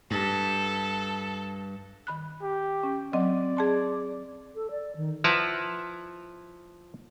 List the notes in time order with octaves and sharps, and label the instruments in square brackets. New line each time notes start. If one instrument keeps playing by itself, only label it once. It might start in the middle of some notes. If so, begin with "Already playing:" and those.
[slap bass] G2 [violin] A4
[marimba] D#3 B5 F#6
[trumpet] G4
[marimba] C#4
[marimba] F#3 C4 D#5 [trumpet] D5
[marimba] G#4 A5 C6
[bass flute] A4
D5
D#3
[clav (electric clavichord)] F3 E4 B4 F#5 A5 A#5